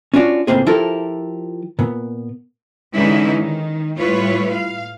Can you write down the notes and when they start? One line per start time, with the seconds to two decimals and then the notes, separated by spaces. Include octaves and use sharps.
0.14 C#4 D4 F4 F#4 D5
0.47 C#2 A2 A#3 C4 G#4
0.67 F3 E4 G4 A4 A#4
1.79 A#2 B3
2.94 D3 E3 G#3 C#4 D#4 E4
3.40 D#3
3.98 A2 G3 E4 F4 B4 C#5
4.52 F5